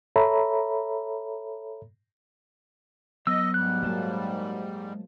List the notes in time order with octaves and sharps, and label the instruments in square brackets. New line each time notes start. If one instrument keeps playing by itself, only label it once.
[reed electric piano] A4 C#5 E5 A#5 B5
[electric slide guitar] F#3 B3 [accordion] D#5 [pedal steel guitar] E6
[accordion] G#2 G3 [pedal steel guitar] F#6
[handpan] F#3 A#3 [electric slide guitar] G#3 C5 A5